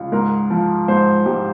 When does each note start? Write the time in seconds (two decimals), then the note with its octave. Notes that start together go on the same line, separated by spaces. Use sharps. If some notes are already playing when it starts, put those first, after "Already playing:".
Already playing: C#2
0.12 G#2 A#4
0.50 F3
0.88 G#2 C5
1.26 G#2 G4